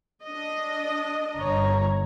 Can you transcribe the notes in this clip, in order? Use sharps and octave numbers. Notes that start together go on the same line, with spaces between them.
D4 D#5
G1 C#5 A#5